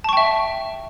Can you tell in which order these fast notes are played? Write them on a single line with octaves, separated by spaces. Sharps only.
A5 C#6 G5 E5